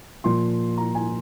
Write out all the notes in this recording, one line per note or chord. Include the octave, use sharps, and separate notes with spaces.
A#2 F3 C6
A#5
G#5